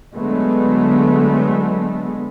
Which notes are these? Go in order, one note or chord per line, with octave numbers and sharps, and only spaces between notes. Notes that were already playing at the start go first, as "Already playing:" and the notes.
D3 F#3 G#3 A3 B3